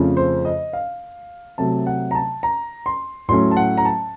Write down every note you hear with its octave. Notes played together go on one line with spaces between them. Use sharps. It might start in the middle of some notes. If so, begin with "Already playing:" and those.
Already playing: F2 C#3 F3 A3 C#4
C5
D#5
F5
C3 F#3 A3 A5
F#5
A#5
A5
A#5
C6
A2 F#3 A3 C#4 C6
A5
F#5
A#5
A5